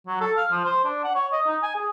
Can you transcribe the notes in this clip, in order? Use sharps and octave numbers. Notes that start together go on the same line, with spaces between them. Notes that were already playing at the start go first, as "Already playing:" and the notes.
F#3
A4
F5
F3
C5
D4
F#5
C#5
D#5
D#4
G#5
G#4